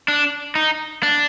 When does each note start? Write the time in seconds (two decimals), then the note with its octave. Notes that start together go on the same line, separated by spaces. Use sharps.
0.08 D4
0.55 D#4
1.03 D4